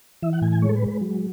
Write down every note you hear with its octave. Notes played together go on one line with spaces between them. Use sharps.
E3 E5
F#5
A2 G#5
G#5
G#3 C#5
A4
B4
G#3
B4
F#3